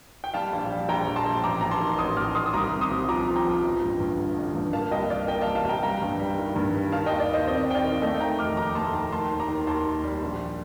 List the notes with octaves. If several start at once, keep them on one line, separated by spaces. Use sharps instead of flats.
G5
G3 F5 A5
A#1
G3
A#1 G5 A#5
A#1
A5 C6
A#1
A1 A#5 D6
A1 A#5
A5 C6
D#3
A1 C6 D#6
A1 D6 F6
D#3 C6 D#6
D#6
C2 A#5 D6
C4
C6 D#6
C2
F3 A#5 D6
F3
G5 A#5
F3
A1
G2
G2
D3
A1
G2
A#3 F5 A5
C2 D#5 G5
A#3 D5 F5
A#3 D#5 G5
F5 A5
C2
F5 A5
C2 G5 A#5
G3 G5 A#5
G2
G3
D#3
G2
G3
D#3 F5 A5
D#2 D#5 G5
D5
D#3 C5 D#5
C4 C5 D#5
D#3 G5
D5 F5
D#3
A3 D#5 G5
D#3 G5 A#5
F1 D6 F6
D#2 A#5 D6
A3 A5 C6
D#3 G5 A#5
D#3 A5 C6
D#2
A#5 D6
D#3
D#2 A5 C6
D#2
G3
A#1